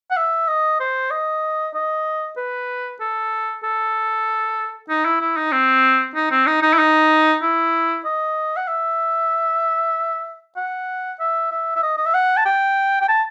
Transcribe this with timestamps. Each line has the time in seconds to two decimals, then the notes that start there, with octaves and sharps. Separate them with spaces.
0.11 F#5
0.17 E5
0.48 D#5
0.80 C5
1.11 D#5
1.74 D#5
2.37 B4
3.00 A4
3.63 A4
4.89 D#4
5.05 E4
5.21 E4
5.36 D#4
5.52 C4
6.16 D#4
6.31 C4
6.47 D#4
6.62 D#4
6.74 E4
6.79 D#4
7.42 E4
8.05 D#5
8.56 F#5
8.68 E5
10.57 F#5
11.20 E5
11.51 E5
11.76 E5
11.83 D#5
11.97 D#5
12.06 E5
12.14 F#5
12.37 A5
12.45 G5
13.01 G5
13.08 A5